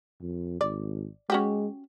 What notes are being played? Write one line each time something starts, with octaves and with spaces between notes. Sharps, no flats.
F2
G#1 D5
G#3 C#4 F#4 G4